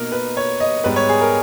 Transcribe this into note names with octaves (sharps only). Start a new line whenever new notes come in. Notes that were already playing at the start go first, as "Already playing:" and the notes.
Already playing: B2 A#3 D#4 A#4
B4
C#5
D#5
G#2 G3 B3 B4
C#5
G#4
A#4